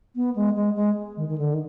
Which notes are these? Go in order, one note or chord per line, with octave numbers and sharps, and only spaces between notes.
B3
G#3
G#3
G#3
D#3
D#3
D3
D#3